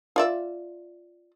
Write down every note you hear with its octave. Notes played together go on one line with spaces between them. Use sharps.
F4 D5 E5